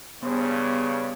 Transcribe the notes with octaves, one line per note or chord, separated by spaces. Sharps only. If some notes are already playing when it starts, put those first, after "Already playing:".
G2 C#3 B3